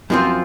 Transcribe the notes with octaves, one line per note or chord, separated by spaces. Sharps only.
F#2 F3 C4 F4